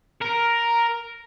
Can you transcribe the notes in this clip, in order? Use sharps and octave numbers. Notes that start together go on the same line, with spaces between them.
A#4